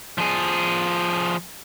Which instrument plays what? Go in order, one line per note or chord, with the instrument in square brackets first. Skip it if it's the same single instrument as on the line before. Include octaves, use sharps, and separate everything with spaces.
[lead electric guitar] F3 G#4